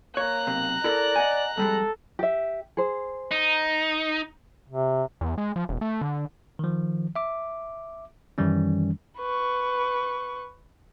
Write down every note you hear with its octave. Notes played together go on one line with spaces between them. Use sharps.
A#3 C#5 A#5 F#6
B1 C3
E4 A4 A#4 D5
D#5 F#5 G#5
F2 G3 G#3 A4
G4 E5
G#4 C5
D#4
C3
E2
G#3
F3
E1
A3
D3
D#3 F3
E5 D6
F#2 D#3 E3 G3 C#4
B4 C#6